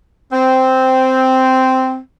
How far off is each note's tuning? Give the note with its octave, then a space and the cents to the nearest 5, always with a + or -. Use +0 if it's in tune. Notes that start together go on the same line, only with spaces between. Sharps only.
C4 -5